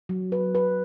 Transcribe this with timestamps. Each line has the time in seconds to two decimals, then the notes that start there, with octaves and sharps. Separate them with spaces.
0.09 F#3
0.32 B4
0.55 B4